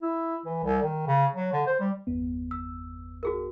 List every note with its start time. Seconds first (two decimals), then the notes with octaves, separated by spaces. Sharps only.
0.02 E4
0.45 E3
0.63 C2
0.83 D#3
1.07 C#3
1.35 F#3
1.53 D3
1.66 C5
1.80 G3
2.07 G1 E2 B3
2.51 E6
3.23 F#4 G#4 A#4